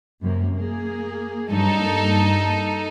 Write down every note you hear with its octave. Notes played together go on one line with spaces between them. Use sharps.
F#2 C3 A#3
A#3 G#4
G2 F#3 G3 D#4 A4
G2 A#3